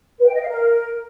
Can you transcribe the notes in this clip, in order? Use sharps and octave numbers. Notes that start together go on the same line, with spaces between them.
B4
G5
D#5
F5
A#4